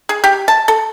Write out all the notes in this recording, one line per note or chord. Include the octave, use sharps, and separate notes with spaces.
G#4
G4
A5
A4